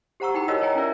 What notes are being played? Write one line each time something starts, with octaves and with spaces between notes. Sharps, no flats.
G4 C5 F#5 A#5 C#6 E6
D#4 E4 G#4 F#5 G5 B5
F4 F#4 A#4 C#5 D#5 E6
C#5 D#5 G5 G#5 A#5
C#4 E4 F4 A#4 D5 E5